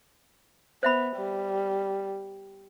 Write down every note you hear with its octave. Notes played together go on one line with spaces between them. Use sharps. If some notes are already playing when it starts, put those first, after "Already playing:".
B3 C5 E5 B5
G3